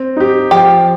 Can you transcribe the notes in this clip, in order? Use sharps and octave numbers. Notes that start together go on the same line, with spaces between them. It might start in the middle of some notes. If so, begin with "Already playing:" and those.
Already playing: C4
D#4 G4
F3 G4